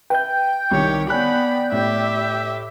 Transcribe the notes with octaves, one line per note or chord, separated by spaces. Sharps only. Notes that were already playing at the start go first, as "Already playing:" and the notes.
B4 E5 G5 G6
C2 D#3 G4 C#5 C#7
B3 C#5 D5 G#5 B5 F#6
A2 G4 E5